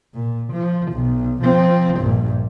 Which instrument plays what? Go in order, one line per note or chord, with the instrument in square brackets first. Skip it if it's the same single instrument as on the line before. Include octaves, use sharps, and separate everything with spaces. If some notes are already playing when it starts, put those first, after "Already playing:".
[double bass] A#2
F3
B1
F3 C4
A#1 G2